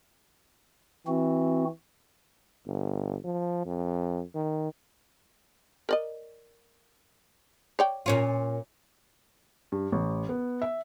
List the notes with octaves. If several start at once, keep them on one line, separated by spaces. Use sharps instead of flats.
E3 C4 F#4
G1
F3
F2
D#3
A#4 D5 D#5
C#5 D5 G5
A#2 C#4 F4
G2
A1
B3
E5